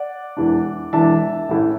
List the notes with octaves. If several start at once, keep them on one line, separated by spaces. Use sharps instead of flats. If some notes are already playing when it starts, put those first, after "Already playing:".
Already playing: D5 F#5
E1 E2 E3 D4
E1 E2 E3 D4 E5 A5
A1 A2 E3